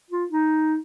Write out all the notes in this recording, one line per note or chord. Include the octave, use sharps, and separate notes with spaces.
F4
D#4